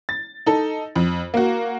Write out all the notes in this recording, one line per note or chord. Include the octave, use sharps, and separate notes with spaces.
A6
D#4 A4
F2
A#3 F#4